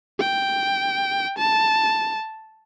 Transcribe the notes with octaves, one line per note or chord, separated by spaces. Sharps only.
G5
A5